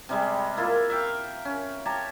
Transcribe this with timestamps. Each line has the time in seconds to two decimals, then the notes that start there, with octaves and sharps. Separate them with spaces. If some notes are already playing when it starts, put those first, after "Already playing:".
0.09 C3 G3 G#3
0.57 A#3 E4 F4 A#4
0.90 E5 F5 G5
1.45 C#4
1.86 G4 C#5 A5 A#5